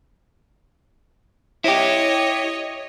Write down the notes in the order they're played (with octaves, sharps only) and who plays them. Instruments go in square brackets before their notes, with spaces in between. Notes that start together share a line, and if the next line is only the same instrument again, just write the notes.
[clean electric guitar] E4 G4 [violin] C#5 D#5